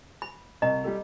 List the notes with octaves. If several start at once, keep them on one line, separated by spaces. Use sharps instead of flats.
B5
C2 D#5 A#5
G3 G4 A4